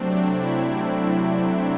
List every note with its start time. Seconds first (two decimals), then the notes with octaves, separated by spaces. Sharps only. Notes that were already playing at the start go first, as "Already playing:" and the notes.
Already playing: C3 F#3 A3 C4 D4
0.11 D4
0.41 E4